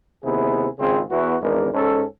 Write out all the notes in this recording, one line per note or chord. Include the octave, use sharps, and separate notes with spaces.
D#2 C3 B3 E4 G#4
G#1 C#3 C4 F4 G#4
E2 B3 E4 F#4
G#1 E2 G#3 D4 A#4
G#2 C#4 A4